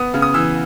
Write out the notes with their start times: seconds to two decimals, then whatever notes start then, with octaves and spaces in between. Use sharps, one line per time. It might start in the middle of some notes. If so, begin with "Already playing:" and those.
Already playing: B3 D#6
0.14 C#3
0.22 D#6
0.34 E3 E6